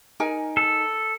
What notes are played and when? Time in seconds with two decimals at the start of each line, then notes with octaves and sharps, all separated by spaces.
0.20 D#4 A#4 G#5
0.57 A4